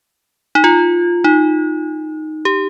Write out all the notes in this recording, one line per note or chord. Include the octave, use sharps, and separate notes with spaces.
D#4
F4
D#4
G4